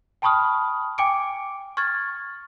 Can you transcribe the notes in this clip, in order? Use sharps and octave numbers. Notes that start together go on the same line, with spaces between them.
G5 A5 B5 C#6 D#6 F6
G5 G#5 D6 C#7 D7
C#6 F6 G#6 A6